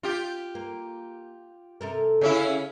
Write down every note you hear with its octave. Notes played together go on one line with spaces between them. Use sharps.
F4 G4
A#3
C3 A4 A#4
C#3 C#4 E4 G#4